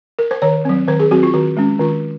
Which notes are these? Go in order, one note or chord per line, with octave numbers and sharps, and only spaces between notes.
A#4
C5
D#3 C#5
F#3 C4
D#3 C5
G#4
F#3 C4 F#4
F4
D#3 F#4
G#3 C#4
D#3 F4